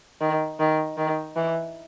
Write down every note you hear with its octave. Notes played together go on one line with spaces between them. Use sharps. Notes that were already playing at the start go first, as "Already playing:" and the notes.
D#3
D#3
D#3
E3